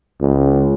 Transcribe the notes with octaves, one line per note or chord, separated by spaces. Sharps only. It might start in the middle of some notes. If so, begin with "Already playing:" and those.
C#2